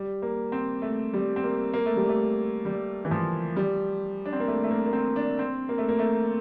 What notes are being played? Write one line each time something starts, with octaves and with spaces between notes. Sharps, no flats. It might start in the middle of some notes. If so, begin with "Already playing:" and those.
Already playing: G3
A#3
C4
A3
G3
C4
A#3
A#3
A3
G3
A3
G3
E3
F3
G3
D4
C4
A#3
A3
A3
A#3
A#3
C4
D4
C4
A#3
A3
A#3
A3